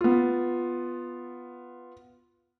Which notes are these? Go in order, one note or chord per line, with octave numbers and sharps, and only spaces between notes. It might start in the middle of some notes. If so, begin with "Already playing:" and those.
B3 F4